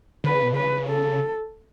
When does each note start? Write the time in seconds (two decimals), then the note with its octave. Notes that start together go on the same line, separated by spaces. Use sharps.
0.24 D3 B4
0.34 C#3
0.43 B2
0.53 C#3 B4
0.88 A4